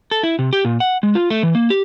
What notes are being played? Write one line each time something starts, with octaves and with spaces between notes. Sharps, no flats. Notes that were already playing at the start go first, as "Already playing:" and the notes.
A4
E4
C3
G4
A#2
F#5
G#3
F4
A3
E3
A#3
G4